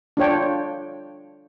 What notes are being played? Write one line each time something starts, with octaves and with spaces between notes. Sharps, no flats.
D4 F4 C#5 G5